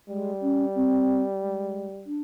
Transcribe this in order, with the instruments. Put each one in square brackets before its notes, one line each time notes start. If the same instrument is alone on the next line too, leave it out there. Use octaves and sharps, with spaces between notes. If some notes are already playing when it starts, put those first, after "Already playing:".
[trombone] G3 [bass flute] G#3
[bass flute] C#4
C4
G#3
D4